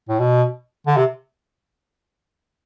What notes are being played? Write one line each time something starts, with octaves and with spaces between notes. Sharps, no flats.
A2
B2
D3
C3